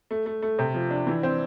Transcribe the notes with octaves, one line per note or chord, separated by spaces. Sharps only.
A3
A3
A3
C3
F3
D4
E3
C4